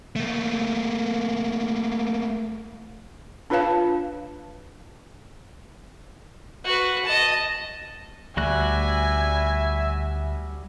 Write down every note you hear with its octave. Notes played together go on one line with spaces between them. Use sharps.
A3 A#3
D4 F4 B4 C#5 F5 A5
F#4 B4
D#5 A5
D2 G3 F#4 E5 G#5 F#6